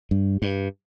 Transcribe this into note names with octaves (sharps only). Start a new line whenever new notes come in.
G2
G2